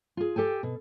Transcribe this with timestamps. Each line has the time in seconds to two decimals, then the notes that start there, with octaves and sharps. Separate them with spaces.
0.17 F4 G#4
0.36 G4 A4 G5 G#5
0.63 B2